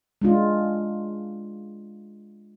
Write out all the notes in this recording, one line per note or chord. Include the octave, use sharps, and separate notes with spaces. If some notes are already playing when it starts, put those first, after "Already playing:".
G#3 D4 F4